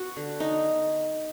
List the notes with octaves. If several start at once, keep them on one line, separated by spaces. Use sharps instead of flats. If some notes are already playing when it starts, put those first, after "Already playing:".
Already playing: B3 F#4
D3
D#4